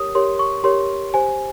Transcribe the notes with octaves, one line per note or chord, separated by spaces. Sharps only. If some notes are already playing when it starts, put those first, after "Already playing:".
Already playing: G4 A#4 C#5 D#6
G4 A#4 C#5 C6
C#6
G4 A#4 C#5 C6
G4 C5 G#5